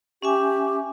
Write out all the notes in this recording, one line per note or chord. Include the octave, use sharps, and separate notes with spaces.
C#4 G4 E5 G#5